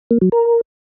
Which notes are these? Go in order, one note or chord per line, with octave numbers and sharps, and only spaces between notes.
A#3
F#3
A#4